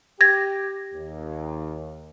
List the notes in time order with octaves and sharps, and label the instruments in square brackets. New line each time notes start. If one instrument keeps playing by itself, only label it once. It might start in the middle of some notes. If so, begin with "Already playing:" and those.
[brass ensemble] G4 [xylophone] G#6 A#6
[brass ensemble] D#2